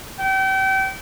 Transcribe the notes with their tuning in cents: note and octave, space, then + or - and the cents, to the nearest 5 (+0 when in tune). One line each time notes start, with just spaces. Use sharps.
G5 -35